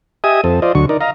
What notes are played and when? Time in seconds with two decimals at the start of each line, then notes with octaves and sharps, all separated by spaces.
0.24 G4 D#5 E5 G#5 D#6
0.44 F2 C4 A4
0.62 F4 C5 D5 D#5
0.75 D2 D3 F#3 C#6
0.89 D#4 A#4 D5
1.01 D#5 F5 A#5